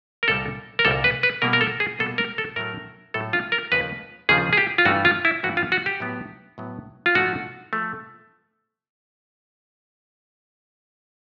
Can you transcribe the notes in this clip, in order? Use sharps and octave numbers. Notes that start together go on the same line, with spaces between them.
A#4
C2 A#2 G3 A4
A#4
C2 A#2 G3 A4
B4
B4
B2 G3 A#3 A#4
A#4
A4
G#4
B2 G3 A#3 A4
A#4
A4
A2 F#3 A3 A#4
A2 F#3 A3 A4
F4
A#4
D#2 C#3 F3 B4
D#2 C#3 F3 G#4
G#4
G4
F4
G2 E3 A3 F#4
F4
E4
G2 E3 A3 F#4
F4
F#4
G4
A2 F#3 B3
A2 F#3 B3
F4
G#2 F3 A3 F#4
F3 A3